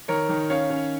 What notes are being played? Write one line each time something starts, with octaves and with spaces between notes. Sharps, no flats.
D#3 A#4 C#5
D#3
C#4 C#5 F5
C#4